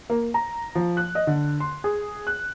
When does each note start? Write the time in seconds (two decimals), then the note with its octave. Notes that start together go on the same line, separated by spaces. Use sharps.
0.10 A#3
0.34 A#5
0.75 F3
0.97 F#6
1.15 D#5
1.27 D3
1.60 C6
1.84 G#4
2.27 F#6